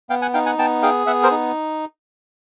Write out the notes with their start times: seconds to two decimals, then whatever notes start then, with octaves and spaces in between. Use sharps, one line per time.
0.10 B3 F5 G5
0.22 F#5 G#5
0.34 D#4 F5 G5
0.46 F#5 G#5
0.58 B3 G5 A5
0.82 G#4 F5 G5
1.06 B3 E5 F#5
1.23 A#4 C5
1.31 D#4